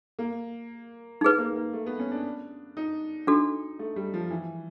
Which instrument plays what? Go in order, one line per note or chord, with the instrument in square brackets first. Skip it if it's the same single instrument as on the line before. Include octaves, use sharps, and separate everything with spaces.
[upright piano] A#3
[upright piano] A3 [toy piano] D#4 G#4 B4
[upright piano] A#3
A#3
A3
B3
C#4
D4
D#4
[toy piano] D4 F#4 A4 [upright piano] D#4
[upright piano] A3
G3
F3
E3